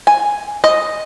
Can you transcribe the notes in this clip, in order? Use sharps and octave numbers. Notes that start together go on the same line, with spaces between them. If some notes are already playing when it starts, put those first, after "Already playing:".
G#5
D#5